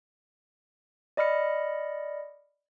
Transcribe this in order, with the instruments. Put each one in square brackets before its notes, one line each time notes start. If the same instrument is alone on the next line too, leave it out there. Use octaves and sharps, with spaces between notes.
[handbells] D5 D#5 B5 F6 C#7